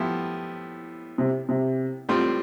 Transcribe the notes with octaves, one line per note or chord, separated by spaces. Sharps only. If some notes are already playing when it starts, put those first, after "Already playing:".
Already playing: A2 F3 B3 E4 G4
C3
C3
A2 G3 C4 F4